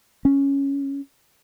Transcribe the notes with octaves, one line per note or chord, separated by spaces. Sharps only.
C#4